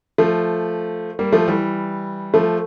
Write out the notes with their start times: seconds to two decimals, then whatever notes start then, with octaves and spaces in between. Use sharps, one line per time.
0.18 F3 A3
1.19 G3 A#3
1.32 F3 A3
1.48 E3 G3
2.34 F3 A3